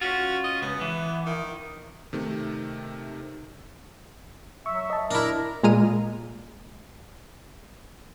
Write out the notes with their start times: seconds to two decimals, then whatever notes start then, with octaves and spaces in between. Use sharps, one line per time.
0.01 C#4 F4 F#4
0.44 D#5
0.62 C#2 B3
0.81 E3
1.26 D#3
2.13 C3 D#3 A3
4.66 F#3 E5 C#6
4.90 D#5 A5
5.11 D4 E4 A#4
5.63 A#2 G#3 A#5 F6 D#7